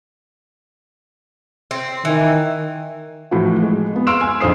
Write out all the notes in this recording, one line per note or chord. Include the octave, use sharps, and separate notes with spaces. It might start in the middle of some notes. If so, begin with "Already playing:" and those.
C4
D#3 E3
A2 E3 F3 F#4
G#3
G#3 B3
C6 E6 F6 D7 E7
G#5
A#1 F2 C5 D#6 C7